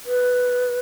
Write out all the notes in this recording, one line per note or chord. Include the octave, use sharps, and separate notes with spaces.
B4